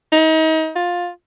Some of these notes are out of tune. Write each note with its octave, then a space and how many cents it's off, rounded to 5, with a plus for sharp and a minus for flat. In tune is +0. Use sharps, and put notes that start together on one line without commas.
D#4 +35
F4 +15